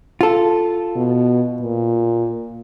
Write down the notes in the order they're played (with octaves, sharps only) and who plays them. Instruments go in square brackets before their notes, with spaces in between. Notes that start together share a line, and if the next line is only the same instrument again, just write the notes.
[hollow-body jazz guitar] F4 A4
[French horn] B2
A#2